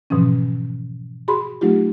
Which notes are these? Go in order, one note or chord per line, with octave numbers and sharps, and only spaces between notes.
G#2 B2 E3 F3 C#4
F#4 G#4 B5 C6
F#3 A3 D#4 F4 G4